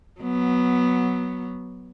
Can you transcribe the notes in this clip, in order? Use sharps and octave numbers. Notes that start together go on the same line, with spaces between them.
F#3 B3